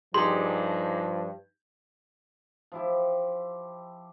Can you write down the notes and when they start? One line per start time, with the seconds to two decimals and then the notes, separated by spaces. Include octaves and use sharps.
0.14 G2 F3 D#4 G4 G#4 C6
2.72 F3 E4 G4